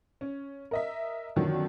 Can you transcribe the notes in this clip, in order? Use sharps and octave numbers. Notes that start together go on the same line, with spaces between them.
C#4
A#4 D#5 E5
F#2 B2 D3 D#3 F3 F#3